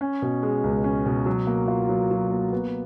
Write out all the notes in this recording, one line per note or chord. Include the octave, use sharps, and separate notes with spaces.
C#4
B2
G#3
C#2
C#4
B2
F#3
A#3
F4
F#3
F#3
A#3
B3